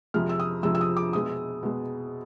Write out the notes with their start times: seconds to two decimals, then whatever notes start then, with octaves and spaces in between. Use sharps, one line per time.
0.14 F2 C3 F3 G#3 F6
0.29 E6
0.40 D#6
0.63 F2 C3 F3 G#3 E6
0.75 E6
0.81 D#6
0.97 D6
1.13 B2 G#3 D#6
1.63 B2 G#3